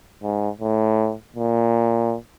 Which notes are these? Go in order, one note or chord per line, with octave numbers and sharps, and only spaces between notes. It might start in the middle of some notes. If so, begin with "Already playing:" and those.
G#2
A2
A#2